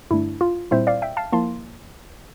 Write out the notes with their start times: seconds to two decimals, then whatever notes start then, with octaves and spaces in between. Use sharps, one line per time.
0.11 G2 D3 A3 D4 E4
0.41 F4
0.71 A#2 G3 C4 E4 C5 E5
0.87 D5 F5
1.02 E5 G5
1.17 F5 A5
1.32 F3 A#3 E4 A5 C6